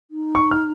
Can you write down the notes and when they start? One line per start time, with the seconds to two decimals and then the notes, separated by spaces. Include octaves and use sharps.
0.11 D#4
0.35 C#6
0.51 F6